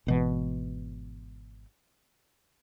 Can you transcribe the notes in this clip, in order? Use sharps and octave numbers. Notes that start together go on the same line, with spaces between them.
G#1 B2 E3